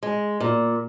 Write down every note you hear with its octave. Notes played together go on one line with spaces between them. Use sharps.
G#3
A#2